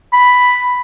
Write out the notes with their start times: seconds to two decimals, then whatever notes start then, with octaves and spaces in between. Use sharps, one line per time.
0.13 B5